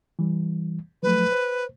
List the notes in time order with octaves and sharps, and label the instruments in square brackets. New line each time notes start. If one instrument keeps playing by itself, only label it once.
[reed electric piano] E3 G3
[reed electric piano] F3 F#3 A3 [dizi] B4
[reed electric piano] C5